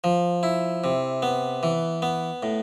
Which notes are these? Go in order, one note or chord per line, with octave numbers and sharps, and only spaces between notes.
F3
E4
C3
B3
E3
B3
A2